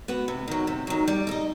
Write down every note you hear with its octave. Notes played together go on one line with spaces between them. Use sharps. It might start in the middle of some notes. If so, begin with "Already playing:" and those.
B3 F#4 B4
C3
D#3 F#3
C3
D#3 F#3
G3
D#4 A4 D#5